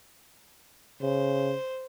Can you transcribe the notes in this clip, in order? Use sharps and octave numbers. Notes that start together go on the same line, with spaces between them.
C#3 C5